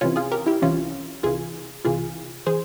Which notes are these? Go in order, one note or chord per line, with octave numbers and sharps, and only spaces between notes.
C2 C3 E3 C#4 F4
F4 G#4
G4 A#4
E4 G4
C2 C3 E3 C#4 F4
C2 C3 E3 F4 G#4
C2 C3 E3 F4 G#4
E3 G#4 C5